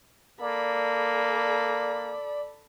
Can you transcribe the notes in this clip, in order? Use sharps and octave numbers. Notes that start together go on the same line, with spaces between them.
A#3 A4 D5 B5